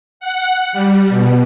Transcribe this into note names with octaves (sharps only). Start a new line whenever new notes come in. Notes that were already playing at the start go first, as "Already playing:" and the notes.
F#5
G3
B2